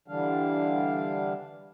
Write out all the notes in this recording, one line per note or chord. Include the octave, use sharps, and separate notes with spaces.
D3 E3 G3 D4 F5